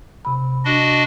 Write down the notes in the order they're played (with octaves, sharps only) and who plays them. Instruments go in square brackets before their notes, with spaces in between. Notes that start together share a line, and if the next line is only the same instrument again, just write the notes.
[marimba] C3 B5
[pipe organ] D4 F#4 D#5